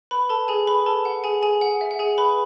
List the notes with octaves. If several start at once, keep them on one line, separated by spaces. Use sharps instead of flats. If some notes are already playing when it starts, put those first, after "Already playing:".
B4 B5
A4 A5
G#4 G#5
B4 B5
A4 A5
F#5
G#4 G#5
G#4 G#5
F#5
E5
F#5
G#4 G#5
B4 B5